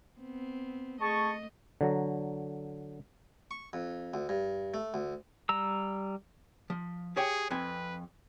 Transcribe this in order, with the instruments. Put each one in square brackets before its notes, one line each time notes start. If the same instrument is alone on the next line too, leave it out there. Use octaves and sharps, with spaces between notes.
[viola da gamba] B3 C4
[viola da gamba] A3 D#5 [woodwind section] G#4 A5 C#6
[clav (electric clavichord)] D3 F#3 A#5
[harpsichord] C#6
F2
D2
G2
A3
D2
[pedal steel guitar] G3 A#5 E6
[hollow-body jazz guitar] F3
[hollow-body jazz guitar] G4 C#5 G5 [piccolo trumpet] G#4
[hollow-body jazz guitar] F2 C4 G#5 [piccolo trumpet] B4